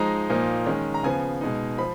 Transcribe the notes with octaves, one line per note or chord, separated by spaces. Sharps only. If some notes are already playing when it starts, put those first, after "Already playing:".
Already playing: F3 G#3 D#4 A#5
A#2 F3 A#3 D#4
D#3 G#3 C#4
A#5
C#3 F3 B3 G#5
B2 G#3 D#4
F3 B5